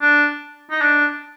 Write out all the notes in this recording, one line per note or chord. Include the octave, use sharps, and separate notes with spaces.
D4
D#4
D4